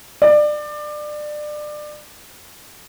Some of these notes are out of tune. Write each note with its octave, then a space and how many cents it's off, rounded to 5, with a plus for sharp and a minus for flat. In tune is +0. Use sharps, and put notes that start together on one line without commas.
D5 +25